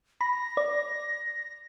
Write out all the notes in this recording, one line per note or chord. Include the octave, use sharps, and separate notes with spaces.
B5 A#6
D5